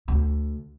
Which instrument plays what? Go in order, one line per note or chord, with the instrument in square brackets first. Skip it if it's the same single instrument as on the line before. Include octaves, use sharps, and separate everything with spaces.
[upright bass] D2